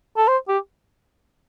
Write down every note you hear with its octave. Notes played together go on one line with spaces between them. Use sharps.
A4
C5
G4